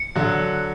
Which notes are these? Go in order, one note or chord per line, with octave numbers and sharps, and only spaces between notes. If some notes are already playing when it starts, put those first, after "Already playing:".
Already playing: C#7
D3 F#3 F#6